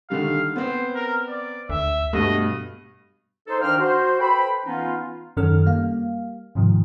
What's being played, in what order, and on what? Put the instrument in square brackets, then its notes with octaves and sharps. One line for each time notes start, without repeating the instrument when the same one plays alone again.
[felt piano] D3 D#3 G3 [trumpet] F5
[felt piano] B3 C4 [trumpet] C5
[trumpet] A#4
D5
[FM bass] D2 [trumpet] E5
[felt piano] G2 B2 [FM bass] A3 [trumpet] D#5
[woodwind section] D#4 A4 C5
D#3 D4 D#4 F5 G5 F6
F#4 C5
A4 B4 C5 G5 B5
E3 B3 C#4 D#4 F4
[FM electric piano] F#2 D#3 C#4 A4 F6
G3 A#3 F5
G#2 C3 D#3 F3